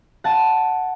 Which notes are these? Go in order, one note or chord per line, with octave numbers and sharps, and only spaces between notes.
F#5 A5